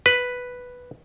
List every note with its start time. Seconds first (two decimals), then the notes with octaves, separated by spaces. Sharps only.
0.06 B4